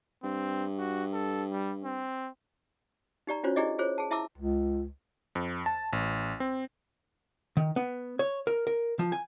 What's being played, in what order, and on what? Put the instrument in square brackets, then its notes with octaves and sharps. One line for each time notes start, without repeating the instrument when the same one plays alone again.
[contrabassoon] G2 [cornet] C4
[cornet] F#4
A4
G3
C4
[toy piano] D#4 G4 D5 A#5
C#4 D4 F4 F#4 C5 C#5
D4 E4 G4 G#4 D5 D#5
F4 G#4 C5 C#5
G#4 A5
E4 E5 A5 A#5 D6 E6
[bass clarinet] C#2
[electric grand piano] F2
A5
A1
C4
[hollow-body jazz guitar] D#3
B3
C#5
A#4
A#4
F3
G#5